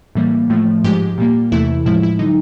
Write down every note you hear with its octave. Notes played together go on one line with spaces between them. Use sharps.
A2 E3 G3 A#3
A2 F3 A3
G#2 F3 G#3 G4
A#2 G3 A#3
E2 C3 E3 A3 E4
A2 F3 G#3 E4
E4
D3 F#3 D#4